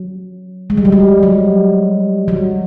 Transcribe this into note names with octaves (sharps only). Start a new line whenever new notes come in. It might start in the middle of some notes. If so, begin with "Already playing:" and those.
Already playing: F#3
G#3
G3
F#3
G3
F#3
F#3